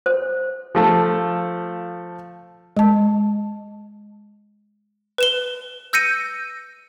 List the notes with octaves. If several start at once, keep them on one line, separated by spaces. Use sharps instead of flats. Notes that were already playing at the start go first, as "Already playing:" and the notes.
C5
F3 A3 A4
G#3 A5
B4 E7 G7
E6 G6 A#6 C#7 D#7